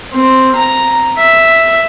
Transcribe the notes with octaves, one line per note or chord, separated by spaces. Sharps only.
C4
A#5
E5